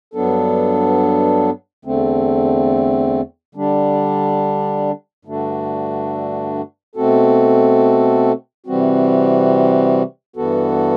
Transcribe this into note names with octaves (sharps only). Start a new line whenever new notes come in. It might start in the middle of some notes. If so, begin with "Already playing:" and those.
G2 F#3 B3 D4 A4
E2 D3 A3 C4
D3 G3 D4
G2 D3 A3 D4 F#4
B2 A3 C4 F#4 A4
C3 E3 G3 C4 F#4
G2 E3 B3 F#4 A4